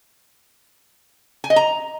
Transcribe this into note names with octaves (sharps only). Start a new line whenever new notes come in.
G#5
D#5
A#5